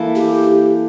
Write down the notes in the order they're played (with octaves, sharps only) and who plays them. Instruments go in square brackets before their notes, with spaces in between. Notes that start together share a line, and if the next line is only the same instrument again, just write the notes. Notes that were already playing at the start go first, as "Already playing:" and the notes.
Already playing: [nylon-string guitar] E3 A#3 E4 A4
[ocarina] G4